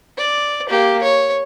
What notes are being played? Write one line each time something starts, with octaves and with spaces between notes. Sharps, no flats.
D5
A#3 G4
C#5